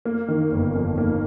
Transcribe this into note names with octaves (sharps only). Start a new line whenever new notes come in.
A#3
D#3
G1
F2
A#3